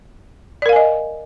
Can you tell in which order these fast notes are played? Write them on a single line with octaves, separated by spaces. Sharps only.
D5 A#4 F5 G#5 D#5